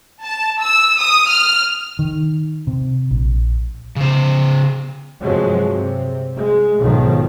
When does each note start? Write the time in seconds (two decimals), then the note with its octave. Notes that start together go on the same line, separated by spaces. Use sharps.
0.23 A5
0.61 E6
0.99 D#6
1.29 F6
1.99 D#3
2.67 C3
3.11 A#1
3.96 C#3 C5
5.21 G2 C3 F3 F#3 G#3
5.70 C3
6.36 G#3
6.78 B1 G#2 D#3 F3